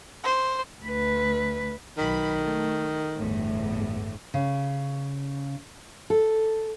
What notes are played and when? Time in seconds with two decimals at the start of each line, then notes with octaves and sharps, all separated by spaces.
0.24 C5
0.83 D2 B4
1.98 B1 D#3 B5
2.42 A3
3.17 G1 E2 A2
4.34 C#3
6.10 A4